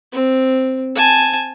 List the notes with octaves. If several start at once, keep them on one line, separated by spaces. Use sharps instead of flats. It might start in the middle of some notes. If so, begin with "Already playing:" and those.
C4
G#5 A5